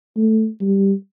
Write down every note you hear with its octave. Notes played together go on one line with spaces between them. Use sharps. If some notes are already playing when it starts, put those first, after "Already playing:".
A3
G3